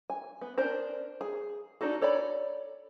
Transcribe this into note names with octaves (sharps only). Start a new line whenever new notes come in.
G#5
B3
C#4 D4 A#4 C5
G#4
D4 D#4 F#4 A4
A4 C#5 D5 B5